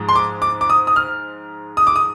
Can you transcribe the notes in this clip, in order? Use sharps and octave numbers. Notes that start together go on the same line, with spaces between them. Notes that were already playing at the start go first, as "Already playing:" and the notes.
Already playing: G#2 F3 G#3
C6
D6
D6
D6
D#6
D#6
F6
D#6
D6
D#6